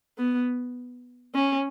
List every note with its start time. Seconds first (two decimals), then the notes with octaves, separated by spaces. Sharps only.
0.18 B3
1.35 C#4